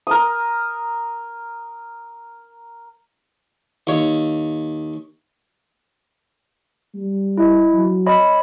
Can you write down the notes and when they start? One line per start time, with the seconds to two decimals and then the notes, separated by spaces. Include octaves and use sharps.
0.07 A#4 D#6
3.87 D#2 C#5
6.95 G3
7.38 E4 D#5
7.73 F#3
8.06 C#5 D#5 B5